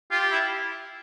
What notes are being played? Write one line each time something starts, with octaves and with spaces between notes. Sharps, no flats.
F4 G4
E4